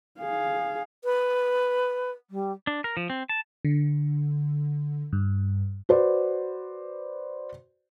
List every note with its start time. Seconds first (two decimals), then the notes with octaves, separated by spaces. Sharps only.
0.20 G#4 F5
1.04 B4
2.30 G3
2.67 D4
2.84 A#4
2.97 F3
3.10 C4
3.29 A5
3.65 D3
5.13 G2
5.89 F#4 B4 C5 D5